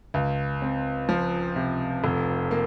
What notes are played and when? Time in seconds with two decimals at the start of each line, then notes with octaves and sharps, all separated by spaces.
0.14 C#2
0.62 C4
1.09 F3
1.56 C3
2.04 F1
2.51 A#3